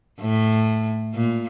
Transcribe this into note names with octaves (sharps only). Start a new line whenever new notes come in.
A2
A#2